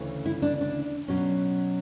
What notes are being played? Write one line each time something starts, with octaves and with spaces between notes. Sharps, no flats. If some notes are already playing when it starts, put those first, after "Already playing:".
Already playing: D2 C#3 E3 A3
E4
D4
D4
B2 F#3 C#4